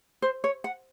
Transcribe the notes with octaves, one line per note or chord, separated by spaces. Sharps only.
C5
C#5
F#5